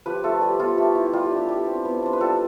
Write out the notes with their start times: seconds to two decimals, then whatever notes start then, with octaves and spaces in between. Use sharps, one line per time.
0.06 F3 G4 B4
0.24 A3 F4 A4
0.41 G3 G4
0.59 B3 F4 A4
0.78 A3 G4
0.95 E4
1.13 G3 F4
1.25 G4
1.31 D4
1.37 G4
1.49 G3 G4
1.66 C4
1.85 B3
2.02 D4 C5
2.13 B4
2.21 G3 F4 A4